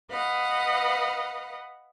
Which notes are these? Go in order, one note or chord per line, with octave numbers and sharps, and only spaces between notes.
B4 D#5 F5 F#5